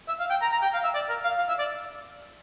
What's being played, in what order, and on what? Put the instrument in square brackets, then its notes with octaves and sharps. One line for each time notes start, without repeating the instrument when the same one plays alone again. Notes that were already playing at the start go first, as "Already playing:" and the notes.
[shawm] E5
F5
G5
A#5
A#5
G5
F5
E5
D5
A#4
F5
F5
E5
D5